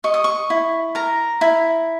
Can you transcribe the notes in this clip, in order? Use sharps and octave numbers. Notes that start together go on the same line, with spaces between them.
D#5 C#6
D#6
C#6
E4
A#4 A#5
E4